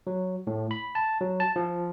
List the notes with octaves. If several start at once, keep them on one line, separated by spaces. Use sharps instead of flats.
F#3
A2
B5
A5
F#3
A5
F3